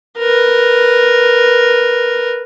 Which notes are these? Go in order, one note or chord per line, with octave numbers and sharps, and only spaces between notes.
A#4 B4